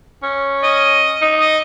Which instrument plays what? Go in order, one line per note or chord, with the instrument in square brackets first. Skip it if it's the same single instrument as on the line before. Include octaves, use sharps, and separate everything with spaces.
[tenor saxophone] C#4
[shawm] D#5
[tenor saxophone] D#4
[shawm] D#5